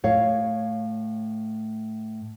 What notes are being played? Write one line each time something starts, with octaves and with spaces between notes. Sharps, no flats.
A2 C#5 F5